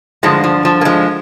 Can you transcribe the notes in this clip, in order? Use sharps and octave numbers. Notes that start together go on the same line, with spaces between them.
G2 D3 F3 G#3
F3
F3
A#3
F3 G#3